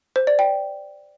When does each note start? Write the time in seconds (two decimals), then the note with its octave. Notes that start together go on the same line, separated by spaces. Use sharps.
0.16 C5
0.27 D5
0.39 G5